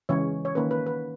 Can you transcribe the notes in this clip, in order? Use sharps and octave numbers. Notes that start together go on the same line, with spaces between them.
C#3 E3 G#3 C#4 C#5
C#5
D#3 A#3 C#4 B4
B4
B4